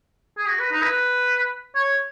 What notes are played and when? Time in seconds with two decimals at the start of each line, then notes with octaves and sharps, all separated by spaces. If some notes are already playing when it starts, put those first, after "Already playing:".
0.38 G#4
0.48 F#4
0.60 B4
0.72 D#4
0.83 B4
1.75 C#5